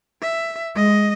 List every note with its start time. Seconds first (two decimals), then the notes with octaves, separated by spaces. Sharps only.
0.22 E5
0.76 G#3 D#5